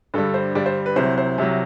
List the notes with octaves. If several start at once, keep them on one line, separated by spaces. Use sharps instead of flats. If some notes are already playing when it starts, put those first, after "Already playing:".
G2 D3 G3 A4
C5
G2 D3 G3 D5
C5
B4
C2 C3 F#3 C5
C5
C2 C3 F#3